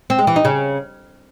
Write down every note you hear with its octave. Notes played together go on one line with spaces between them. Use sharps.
C4
G#3
E3
D#4
C#3